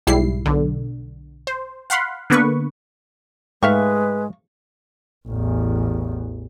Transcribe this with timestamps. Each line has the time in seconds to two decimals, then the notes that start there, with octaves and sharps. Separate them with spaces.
0.07 B1 G#2 G3 E4 C7
0.46 B1 D3
1.47 C5
1.90 F5 F#5 B5 C6
2.30 D3 A#3 B3 B4 C#6
3.63 G#2 G#3 A3 B4 E5 F5 G5 C#6
5.28 A1 E2